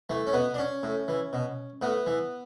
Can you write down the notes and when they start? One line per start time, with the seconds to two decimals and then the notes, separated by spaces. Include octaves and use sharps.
0.10 E3 A3
0.27 C#4
0.33 B2 B3
0.54 D4
0.58 C#4
0.83 A2
1.08 E3
1.33 B2
1.82 A2 B3
2.07 E3